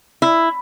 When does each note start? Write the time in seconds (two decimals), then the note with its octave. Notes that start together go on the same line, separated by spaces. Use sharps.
0.22 E4